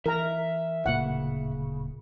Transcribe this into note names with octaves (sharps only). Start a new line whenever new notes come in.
E3 A#4 E5 A#5
D1 A#2 C#3 A#3 F#5